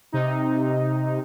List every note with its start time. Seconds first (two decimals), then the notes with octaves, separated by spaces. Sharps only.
0.12 C3 D#4